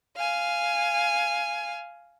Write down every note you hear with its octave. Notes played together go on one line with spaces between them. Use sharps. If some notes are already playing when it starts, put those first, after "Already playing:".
F5 G#5